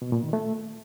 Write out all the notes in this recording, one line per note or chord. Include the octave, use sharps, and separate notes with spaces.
B2
A#2
D#3
A3